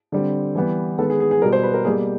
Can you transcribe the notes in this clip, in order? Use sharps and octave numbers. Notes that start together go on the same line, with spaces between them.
D3 G3 C4
E3 G3 B3
D#3 G#3 B3 A4
G#4
G#4
G#4
B2 G3 B3 A#4
C5
B4
A#4
B2 G3 A#3 G#4